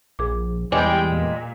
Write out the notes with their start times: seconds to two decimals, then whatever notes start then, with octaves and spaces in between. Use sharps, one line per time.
0.19 A#1 G#4 D6
0.72 E2 G3 G#3 G5 G#5 D6
1.07 A#2